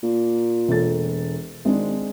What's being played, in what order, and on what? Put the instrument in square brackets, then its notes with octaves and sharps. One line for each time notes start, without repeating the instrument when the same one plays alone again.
[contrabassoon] A#2
[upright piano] E1 A4 A6
[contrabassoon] G#1 [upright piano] G#3 C4 D4